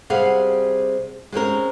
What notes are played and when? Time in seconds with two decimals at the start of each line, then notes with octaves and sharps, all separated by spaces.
0.10 C3 G3 G#4 F5 F#5
1.32 G#3 C4 C#4 A#4